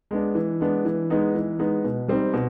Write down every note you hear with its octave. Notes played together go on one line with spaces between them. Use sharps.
G#3 B3 D4
E3
G#3 B3 D4
E3
G#3 B3 D#4
E3
G#3 B3 D#4
B2
G3 C4 D#4
B2